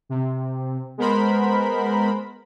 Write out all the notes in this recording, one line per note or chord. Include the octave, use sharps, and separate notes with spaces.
C3
G#3 B3 A#4 C5 B5